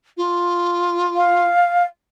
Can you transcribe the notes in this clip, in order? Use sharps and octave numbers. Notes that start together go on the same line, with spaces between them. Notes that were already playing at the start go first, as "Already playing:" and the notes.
F4
F5